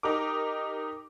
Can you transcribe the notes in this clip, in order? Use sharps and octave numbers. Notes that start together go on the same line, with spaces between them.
D#4 G4 A#4 D6